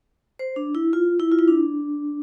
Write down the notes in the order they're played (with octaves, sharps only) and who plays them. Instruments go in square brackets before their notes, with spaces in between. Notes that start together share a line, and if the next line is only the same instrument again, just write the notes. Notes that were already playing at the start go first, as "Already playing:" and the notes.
[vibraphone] C5
D4
E4
F4
E4
F4
E4
D4